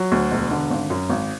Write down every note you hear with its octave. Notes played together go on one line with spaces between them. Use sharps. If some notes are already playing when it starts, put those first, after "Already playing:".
Already playing: F#3
D2
E1
D3
G#1
F#2
G#1